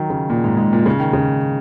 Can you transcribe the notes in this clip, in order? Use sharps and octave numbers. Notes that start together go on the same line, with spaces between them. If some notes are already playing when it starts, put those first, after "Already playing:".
Already playing: D#3 F#3
C#3
A#2
G#2
G#2
A#2
C#3
D#3
C#3